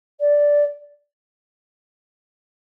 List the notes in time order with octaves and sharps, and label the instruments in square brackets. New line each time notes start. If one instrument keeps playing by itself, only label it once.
[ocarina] D5